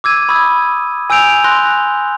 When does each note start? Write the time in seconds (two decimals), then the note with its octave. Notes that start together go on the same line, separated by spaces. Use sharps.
0.04 D6 E6 G#6 D#7
0.29 B5 C#6 D#6 E6 G#6
1.10 G#5 E6 G6 D7 F7
1.44 C6 F#6 A#6